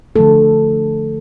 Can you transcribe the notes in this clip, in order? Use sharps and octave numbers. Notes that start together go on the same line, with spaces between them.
D3 F3 A3 A4